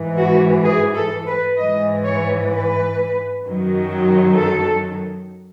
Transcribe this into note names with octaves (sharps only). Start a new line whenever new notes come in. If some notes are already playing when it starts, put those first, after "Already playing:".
Already playing: G#2 E3
F#4
G#4
A4
B4
G#2 E3 D#5
C#5
B4
F#2 D#3 F#3
A4